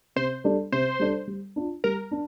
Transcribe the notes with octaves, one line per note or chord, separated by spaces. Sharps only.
C3 C5
G3 D4 A4 D5
C3 C5
G3 D4 A4 D5
G3
D4 F4
G3 A#4
D4